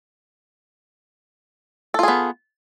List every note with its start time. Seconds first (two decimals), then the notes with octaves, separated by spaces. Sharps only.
1.94 A4
1.99 F4
2.03 G#4
2.08 B3